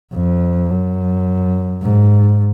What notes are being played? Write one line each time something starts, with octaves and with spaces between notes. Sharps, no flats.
F2
F#2
G#2